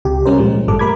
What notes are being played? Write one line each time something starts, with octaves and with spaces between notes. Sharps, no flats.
C#2 C3 G4
G3 C#4 A#4 C5
A#2 F3 G#3
G#1 G2 G3 A4 D6
A3 A#4 B5 D6 G#6